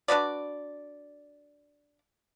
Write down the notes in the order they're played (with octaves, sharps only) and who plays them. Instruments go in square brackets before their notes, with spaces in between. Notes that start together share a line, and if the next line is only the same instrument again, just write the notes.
[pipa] D4 F#4 B4 D5